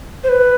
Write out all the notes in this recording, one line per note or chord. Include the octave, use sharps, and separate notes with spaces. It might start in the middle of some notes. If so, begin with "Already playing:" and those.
C5
B4